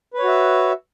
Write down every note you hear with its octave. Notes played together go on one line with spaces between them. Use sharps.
F#4 B4 C#5 E5